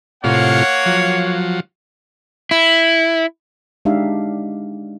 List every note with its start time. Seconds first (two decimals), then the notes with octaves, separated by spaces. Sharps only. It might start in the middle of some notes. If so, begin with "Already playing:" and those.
0.24 A2 C3 A#3 F4 C#5 F#5
0.86 F3 F#3
2.51 E4
3.85 G#3 D4 D#4 G4 E5 F5